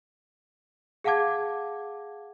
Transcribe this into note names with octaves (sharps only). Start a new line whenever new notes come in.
G#4 F5 F#5 A5 D6 G#6